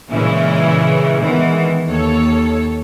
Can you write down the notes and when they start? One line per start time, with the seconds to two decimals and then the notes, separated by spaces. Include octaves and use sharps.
0.11 A#2 C#3 E3 G#3 C#4 E4
1.20 D#3 E3 G#3 B3
1.88 D#2 A4 C#5